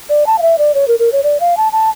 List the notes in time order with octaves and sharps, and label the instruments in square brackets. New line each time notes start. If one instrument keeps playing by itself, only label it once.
[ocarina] D5
A5
F5
E5
D5
C#5
A#4
A#4
C#5
D5
F5
A5
A5